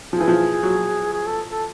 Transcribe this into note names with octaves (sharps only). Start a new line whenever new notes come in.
F3 G#4
E3
F3
F#3
G#4
A4
A4